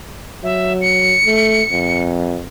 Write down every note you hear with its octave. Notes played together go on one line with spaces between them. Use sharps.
F#3 E5
C#7
A3
F2